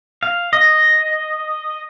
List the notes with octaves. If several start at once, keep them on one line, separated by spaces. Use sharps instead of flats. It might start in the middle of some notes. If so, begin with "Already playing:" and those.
F5
D#5